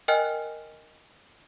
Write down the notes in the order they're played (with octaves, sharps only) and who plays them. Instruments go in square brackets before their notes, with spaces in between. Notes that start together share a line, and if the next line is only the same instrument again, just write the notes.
[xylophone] A#4 D#5 G5 G#5 F6 F#6